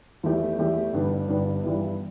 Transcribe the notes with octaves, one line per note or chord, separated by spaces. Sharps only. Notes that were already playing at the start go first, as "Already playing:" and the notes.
E2 E3 A3 E4 G4
E2 E3 A3 E4 G4
G1 G2 G3 B3 D4
G1 G2 G3 B3 D4
G2 E3 G3 B3 E4